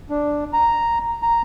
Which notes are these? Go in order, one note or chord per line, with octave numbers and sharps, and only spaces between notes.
D4
A#5
A#5